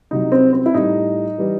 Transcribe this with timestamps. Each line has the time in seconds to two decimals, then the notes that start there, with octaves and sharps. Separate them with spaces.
0.11 C2 C3 F#3 D#4
0.32 C4
0.53 C4
0.66 E4
0.74 A2 G3 D#4
1.38 E3 G3